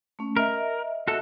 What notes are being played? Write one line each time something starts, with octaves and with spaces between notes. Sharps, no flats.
A3 C#4
A#4 D#5 E5
F#4 A4